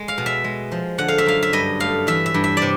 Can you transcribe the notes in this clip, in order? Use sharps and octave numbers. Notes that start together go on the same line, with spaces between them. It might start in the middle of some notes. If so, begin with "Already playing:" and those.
Already playing: G#3
F5
B2
E5
G#3
F3
D3 F#5
F5
E5
F#2 F5
E5
G2 D#5
A3 F5
E3 E5
E5
G2
E5
C3 D5